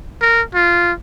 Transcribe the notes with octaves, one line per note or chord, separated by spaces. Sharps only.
A#4
F4